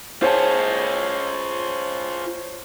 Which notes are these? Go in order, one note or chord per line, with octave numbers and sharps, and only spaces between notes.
F4 G#4 C5 C#5 A5